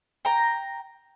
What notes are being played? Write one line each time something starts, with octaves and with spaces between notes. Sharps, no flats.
G5 A#5